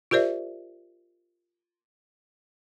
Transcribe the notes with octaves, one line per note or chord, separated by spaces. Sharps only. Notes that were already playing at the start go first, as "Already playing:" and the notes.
F4 G4 A#4 C5 D5 E5